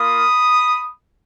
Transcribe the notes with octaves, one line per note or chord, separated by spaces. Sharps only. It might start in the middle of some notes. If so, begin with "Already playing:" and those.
Already playing: A#3 F4 B5 D#6